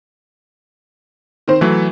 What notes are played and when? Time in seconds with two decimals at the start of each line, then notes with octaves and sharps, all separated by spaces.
1.48 D#3 C4 C5
1.61 E3 F#3 A3